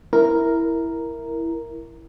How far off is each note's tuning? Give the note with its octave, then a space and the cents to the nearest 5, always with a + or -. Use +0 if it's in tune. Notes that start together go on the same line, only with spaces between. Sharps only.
E4 +0 A#4 +0